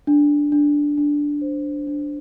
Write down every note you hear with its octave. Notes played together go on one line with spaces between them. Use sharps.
D4
D4
D4
C5
D4